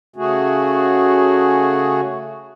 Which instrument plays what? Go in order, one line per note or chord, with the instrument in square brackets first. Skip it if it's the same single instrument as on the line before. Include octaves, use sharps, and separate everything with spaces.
[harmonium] C#3 A3 F#4 G#4